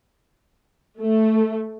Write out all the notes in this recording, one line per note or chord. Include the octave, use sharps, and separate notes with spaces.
A3